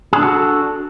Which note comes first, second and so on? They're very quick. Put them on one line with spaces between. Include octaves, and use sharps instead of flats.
G#4 D4 A4 F#4